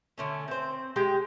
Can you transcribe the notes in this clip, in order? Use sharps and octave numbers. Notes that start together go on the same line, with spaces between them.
D3 A3 C#4
C4 C5
G#3 G4 G5